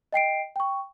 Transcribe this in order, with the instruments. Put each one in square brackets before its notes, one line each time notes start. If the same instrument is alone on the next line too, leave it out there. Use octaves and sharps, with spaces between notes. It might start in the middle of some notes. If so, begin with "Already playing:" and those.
[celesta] D#5 G5 C7 D7
G5 C#6